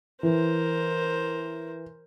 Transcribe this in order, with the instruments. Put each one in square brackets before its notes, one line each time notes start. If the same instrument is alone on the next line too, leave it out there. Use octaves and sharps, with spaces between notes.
[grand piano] E3 [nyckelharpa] A#4 C5